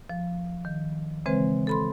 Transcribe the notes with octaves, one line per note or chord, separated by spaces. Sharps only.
F3
D#3
C#3 E3 G#3 C4 B4 C5
A4 B5 C6